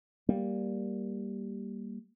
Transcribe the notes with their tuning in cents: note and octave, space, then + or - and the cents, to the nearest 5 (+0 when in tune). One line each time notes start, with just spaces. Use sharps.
G3 +0 A#3 +0